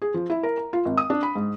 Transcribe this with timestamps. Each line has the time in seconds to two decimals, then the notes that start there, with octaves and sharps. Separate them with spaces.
0.02 G#4
0.14 F3
0.30 E4
0.43 A#4
0.58 A#5
0.73 F4
0.85 G#1
0.97 D#6
1.10 D4
1.23 B5
1.35 G#2